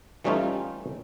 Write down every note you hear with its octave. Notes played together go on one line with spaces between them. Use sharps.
E3 G3 A3 C#4 D#4 F4